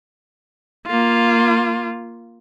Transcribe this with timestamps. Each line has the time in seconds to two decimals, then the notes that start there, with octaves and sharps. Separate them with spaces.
0.87 A#3 F4